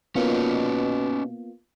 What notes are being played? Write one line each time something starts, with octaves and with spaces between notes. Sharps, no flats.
B2 A#3 B3 C#4 D#4 F4